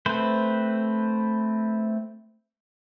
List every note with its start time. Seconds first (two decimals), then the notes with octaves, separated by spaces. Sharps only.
0.06 A3 C4 B4 C5